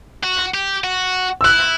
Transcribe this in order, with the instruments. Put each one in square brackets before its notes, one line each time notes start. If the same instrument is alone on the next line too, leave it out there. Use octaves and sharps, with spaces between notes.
[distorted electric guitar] F#4
G4
F#4
[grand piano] E6
[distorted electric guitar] E4 [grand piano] F#6